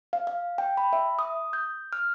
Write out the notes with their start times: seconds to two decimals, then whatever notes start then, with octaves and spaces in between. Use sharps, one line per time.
0.13 F5
0.27 F5
0.58 G5
0.77 B5
0.93 E5
1.19 D#6
1.53 G6
1.93 F6